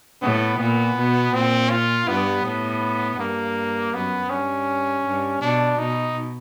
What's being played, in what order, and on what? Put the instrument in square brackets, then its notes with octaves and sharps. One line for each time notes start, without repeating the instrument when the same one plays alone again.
[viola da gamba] A2 [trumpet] B3
[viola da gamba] A#2 [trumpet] B3
[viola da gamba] B2
[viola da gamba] A#2 [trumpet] C4
[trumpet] F4
[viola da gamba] G2 [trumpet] B3
[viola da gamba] A2 [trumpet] B3
[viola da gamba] G2 [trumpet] A#3
[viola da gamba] F#2 [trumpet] B3
[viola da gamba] G2 [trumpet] C#4
[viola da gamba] G2
[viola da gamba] B2 [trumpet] D4
[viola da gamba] B2 [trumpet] D#4